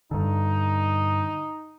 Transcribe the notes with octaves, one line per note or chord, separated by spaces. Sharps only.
G2 D3 D#4